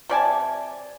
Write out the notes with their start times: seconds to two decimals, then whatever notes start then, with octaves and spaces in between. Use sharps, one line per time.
0.09 C3 D5 G#5 A5